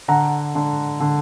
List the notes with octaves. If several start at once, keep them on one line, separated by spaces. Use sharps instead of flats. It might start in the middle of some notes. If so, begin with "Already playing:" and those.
D3 F#5 A#5
D3
D3